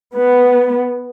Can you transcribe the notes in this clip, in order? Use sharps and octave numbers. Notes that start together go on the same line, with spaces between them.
B3